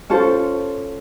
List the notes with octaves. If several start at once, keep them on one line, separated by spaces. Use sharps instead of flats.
C#4 F4 A4 C5